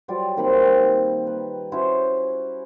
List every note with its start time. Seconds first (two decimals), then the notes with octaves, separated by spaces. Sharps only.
0.08 F#3 G3 F4 D5
0.37 D#3 A#3 C4 B5
1.27 B4
1.72 C#4 E4 F#4 C5